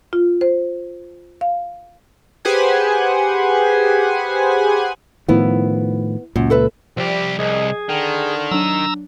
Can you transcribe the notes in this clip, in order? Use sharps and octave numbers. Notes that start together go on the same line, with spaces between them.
F4
C5
F5
G4 G#4 B4 C5 F#5 G#5
A2 D#3 F3 B3 E4
C#2 F#2 A#2
A4 B4 E5
C2 F3 G3 G4 D5
C2 G#4 D#5
D3 D#3 G5
F#3 D4 A#5 E6